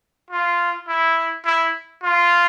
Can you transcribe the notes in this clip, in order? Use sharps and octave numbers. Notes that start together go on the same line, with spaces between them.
F4
E4
E4
F4